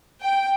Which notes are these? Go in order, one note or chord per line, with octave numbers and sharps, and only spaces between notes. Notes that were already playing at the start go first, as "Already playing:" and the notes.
G5